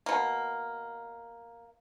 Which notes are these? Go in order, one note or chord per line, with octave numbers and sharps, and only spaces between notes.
B2 A#3